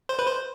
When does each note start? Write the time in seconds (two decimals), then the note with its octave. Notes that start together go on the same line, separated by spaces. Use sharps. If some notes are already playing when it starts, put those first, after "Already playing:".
0.09 C5
0.19 B4
0.28 C5